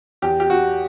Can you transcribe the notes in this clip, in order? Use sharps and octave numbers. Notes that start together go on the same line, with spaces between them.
E2 G4
G4
F#4